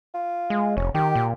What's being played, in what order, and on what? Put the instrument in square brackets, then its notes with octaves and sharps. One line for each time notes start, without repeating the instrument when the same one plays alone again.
[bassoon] F4
[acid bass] G#3
[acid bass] F1 [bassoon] C#4
[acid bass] D#3 [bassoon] G4
[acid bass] A#2